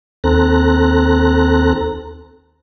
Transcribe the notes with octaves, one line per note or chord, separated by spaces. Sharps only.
D#2 C4 A4 A#5 F#6